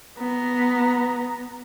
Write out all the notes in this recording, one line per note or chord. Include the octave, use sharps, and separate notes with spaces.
B3 A#5